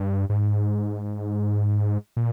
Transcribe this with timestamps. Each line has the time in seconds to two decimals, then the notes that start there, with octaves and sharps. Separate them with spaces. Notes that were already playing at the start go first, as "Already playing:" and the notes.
Already playing: G2
0.29 G#2
2.17 A#2